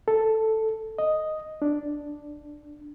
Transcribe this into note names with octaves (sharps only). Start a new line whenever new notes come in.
A4
D#5
D4